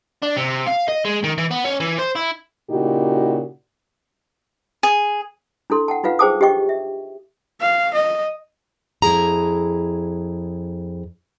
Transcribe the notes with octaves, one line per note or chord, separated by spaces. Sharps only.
D4
C3
F5
D#5
G#3
D#3
E3
B3
C#4
E3
C5
E4
A#2 C#3 D#4 E4 F#4 G4
G#4
D4 E4 A4 C6
F#5 G5 A5
D#4 F4 B4 F5 F#5
G#4 C5 G5 A5 D6 D#6
D4 G4 C5 D#5 G5 C#6
E5
F5
D#5
F2 E4 G#4 A#5